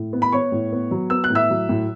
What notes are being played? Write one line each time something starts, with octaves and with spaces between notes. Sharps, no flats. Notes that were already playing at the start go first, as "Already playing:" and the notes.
Already playing: A2
B3
B5
B3 C#5 C#6
A2
B3
F#3
B3 E6
F#6
A2
E5 E6
F#3
A2